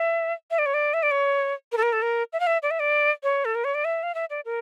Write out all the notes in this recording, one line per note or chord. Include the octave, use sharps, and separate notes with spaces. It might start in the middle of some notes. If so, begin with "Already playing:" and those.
Already playing: E5
E5
D5
C#5
D5
E5
D5
C#5
A#4
A4
A#4
A4
A#4
E5
F5
E5
D5
E5
D5
C#5
A4
A#4
C#5
D5
E5
F5
E5
D5
A#4